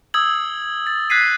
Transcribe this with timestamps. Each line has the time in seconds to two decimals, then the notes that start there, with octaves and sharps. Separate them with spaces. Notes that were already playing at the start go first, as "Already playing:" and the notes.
0.14 D#6 E6 G#6 F#7
0.87 A6
1.10 F#6 G#6 B6 C7 D#7